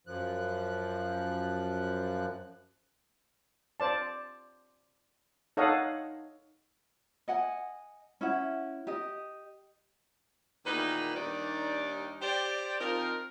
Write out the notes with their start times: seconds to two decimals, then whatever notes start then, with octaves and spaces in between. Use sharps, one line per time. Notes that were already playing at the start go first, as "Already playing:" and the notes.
0.07 F#2 F3 F#6
3.80 C5 D5 A5
5.57 D#4 A4 C#5 D#5 F5 F#5
7.28 D#5 F#5 G#5
8.21 C#4 E4 F#5
8.87 G4 D#5
10.65 E2 A#2 D#3 D#4 B4
11.15 D#2 D#3 G3 D4 D#4 D5
12.21 G4 C5 D5
12.80 F3 C4 D#4 F4 A#4